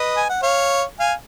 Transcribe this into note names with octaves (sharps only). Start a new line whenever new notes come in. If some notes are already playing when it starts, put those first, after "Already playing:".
Already playing: B4 D#5
G#5
F#5
C#5 F5
F5 G#5